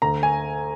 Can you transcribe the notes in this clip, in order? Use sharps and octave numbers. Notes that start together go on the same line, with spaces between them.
D2 A#5
G#5